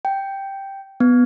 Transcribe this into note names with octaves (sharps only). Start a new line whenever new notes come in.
G5
B3